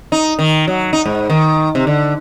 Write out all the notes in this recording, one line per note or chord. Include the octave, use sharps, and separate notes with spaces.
D#4
D#3
F#3
D#4
G#2
D#3
C3
D3